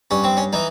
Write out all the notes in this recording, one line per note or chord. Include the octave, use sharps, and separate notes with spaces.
G2 C#4
C4
C#4
E3 D#4